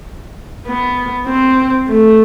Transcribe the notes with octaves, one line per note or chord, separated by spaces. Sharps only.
B3
C4
A3